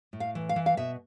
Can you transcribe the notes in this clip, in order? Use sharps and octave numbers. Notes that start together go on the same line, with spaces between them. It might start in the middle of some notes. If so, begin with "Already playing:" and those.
A2
F5
E3
F5
E3
F5
B2 E5